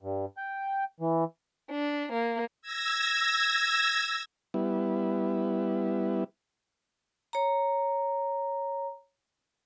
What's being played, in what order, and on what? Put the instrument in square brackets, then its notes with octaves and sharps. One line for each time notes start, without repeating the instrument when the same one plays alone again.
[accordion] G2
G5
E3
[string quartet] D4
A#3
[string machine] E6 G#6 A#6
[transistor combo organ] G3 B3 E4
[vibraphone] C#5 A#5